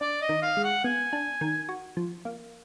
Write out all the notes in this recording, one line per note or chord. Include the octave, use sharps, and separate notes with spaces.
D4 D5
D#5
D#3
F5
G#3
F#5
B3 G#5
D4
D#3
F#4
F3
A#3